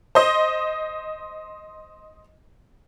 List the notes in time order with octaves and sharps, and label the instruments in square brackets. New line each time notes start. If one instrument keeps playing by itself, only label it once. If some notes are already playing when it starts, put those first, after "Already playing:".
[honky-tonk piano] C5 D#5